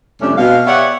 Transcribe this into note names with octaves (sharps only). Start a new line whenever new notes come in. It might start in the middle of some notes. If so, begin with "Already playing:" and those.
F2 C3 G3 A3 C#4 D4
B2 F5
B3 G4 C#5 D5 E5 F#5